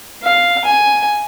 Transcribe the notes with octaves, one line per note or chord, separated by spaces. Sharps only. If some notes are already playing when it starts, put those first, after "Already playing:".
F5
G#5